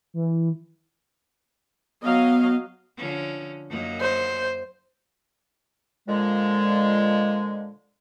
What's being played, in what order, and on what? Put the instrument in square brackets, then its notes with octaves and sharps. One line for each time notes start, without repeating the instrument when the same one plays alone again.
[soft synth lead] E3
[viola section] F#3 D#5 F5 [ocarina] B3
[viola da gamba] D3 F3 C#4
F#2 A#3 D#4
[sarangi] C5
[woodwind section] A#2 D3 F3 G#3